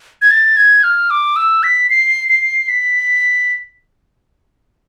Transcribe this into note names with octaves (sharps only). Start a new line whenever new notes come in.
G#6
A6
G#6
F6
D6
E6
B6
C7
C7
B6